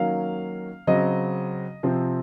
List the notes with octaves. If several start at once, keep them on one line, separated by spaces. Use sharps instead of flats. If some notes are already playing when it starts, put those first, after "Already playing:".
Already playing: D#3 F#3 A#3 C#4 F5
C#3 F#3 C4 D#5
C3 F3 C4